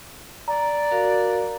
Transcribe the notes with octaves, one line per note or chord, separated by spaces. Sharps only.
D5 A#5
F#4 A#4 F5